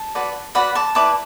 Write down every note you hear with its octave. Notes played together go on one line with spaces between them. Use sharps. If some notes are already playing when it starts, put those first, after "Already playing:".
Already playing: A5
F#4 B4 D5
F#4 B4 D5 F#5 B5
A5 D6
E4 B4 D5 A5 D6